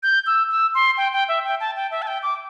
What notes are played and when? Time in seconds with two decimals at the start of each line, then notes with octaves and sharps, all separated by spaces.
0.03 G6
0.27 E6
0.50 E6
0.74 C6
0.97 G5
1.13 G5
1.28 E5
1.44 G5
1.60 A5
1.76 G5
1.91 E5
2.02 A5
2.07 G5
2.23 D6